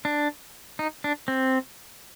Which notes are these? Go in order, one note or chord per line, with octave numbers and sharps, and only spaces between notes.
D4
D#4
D4
C4